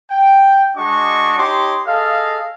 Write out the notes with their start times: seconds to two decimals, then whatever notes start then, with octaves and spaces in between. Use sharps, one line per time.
0.11 G5
0.77 G#3 D4 F#4 D#5 C#6 D6
1.38 D#4 G4 C#5 A5 C6 D6
1.87 G#4 A4 D#5 F5